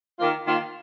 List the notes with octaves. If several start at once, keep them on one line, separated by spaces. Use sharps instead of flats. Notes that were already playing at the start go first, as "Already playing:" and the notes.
D#3 A#3 F4
D#3 A#3 F4